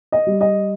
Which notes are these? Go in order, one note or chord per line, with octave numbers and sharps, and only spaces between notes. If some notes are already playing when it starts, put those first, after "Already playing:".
D#5
G3
D#5